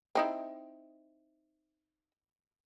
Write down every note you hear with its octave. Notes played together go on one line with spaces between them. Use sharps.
C4 D#4 E4